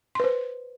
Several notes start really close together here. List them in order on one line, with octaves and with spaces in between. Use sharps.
C6 B4 C5